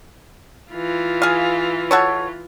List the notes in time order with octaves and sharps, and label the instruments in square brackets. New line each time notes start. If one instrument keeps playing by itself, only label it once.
[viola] E3 F4
[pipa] G#4 F5
F#4 A4 C#5